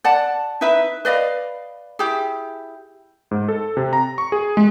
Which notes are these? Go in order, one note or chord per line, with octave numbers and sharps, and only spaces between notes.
D5 F#5 A5
D#4 E4 B4 E5
B4 D5 D#5 F5
E4 G4 G#4
G#2
A4
C3
A#5
C#6
G#4
G#3